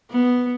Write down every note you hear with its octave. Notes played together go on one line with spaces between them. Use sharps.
B3